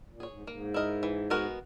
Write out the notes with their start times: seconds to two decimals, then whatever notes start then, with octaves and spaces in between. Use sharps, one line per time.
0.10 A#2
0.20 G#4 C#5
0.29 G#2
0.47 G#2 A#3
0.74 E4 A#4 D#5
1.03 E3
1.30 G#3 B3 F#4 A#4